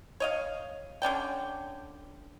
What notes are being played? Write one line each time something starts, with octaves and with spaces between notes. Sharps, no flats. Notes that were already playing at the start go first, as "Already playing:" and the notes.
C#5 D#5 F5
D3 C#4 D5 G5